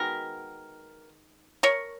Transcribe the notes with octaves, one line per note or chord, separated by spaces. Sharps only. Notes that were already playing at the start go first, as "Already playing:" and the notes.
Already playing: D#3 G#3 B3 F#4 A#4
A#4 C#5